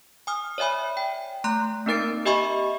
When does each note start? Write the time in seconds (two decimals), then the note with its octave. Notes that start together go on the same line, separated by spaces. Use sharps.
0.27 G#5 D#6 F6
0.58 C#5 D5 E5 G#5 B5
0.97 G5
1.44 A3 A#5 C6 F#6
1.86 A#3 C4 D#4 A#4 A6 D7
2.25 G4 D#5 E5 G#5 B5 C#6